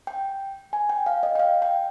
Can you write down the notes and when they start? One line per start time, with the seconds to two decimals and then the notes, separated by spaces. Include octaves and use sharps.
0.07 G5
0.73 G#5
0.89 G5
1.06 F5
1.23 D#5
1.35 G5
1.39 F5
1.62 G5